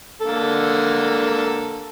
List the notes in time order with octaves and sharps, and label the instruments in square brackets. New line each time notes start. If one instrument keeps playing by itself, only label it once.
[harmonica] D3 A#3 A4